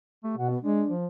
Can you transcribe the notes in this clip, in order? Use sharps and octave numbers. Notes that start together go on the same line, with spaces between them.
A3 G4
B2 F#5
B3
G#3 D4
F3